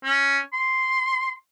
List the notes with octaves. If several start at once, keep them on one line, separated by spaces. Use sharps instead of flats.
C#4
C6